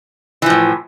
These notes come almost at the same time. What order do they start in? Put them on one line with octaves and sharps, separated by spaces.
E3 F3 A2